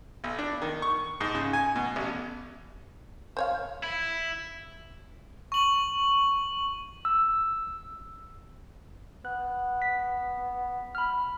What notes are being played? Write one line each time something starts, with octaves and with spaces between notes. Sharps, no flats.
B1
D4
D#3
C#6
G#2
C#3
G#5
B2
A1
C5 C#5 F5
E4
C#6 F#7
E6
B3 F#6
B6
B5 F6